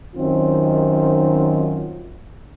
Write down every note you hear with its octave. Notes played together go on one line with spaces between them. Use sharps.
F#2 D#3 C4 F4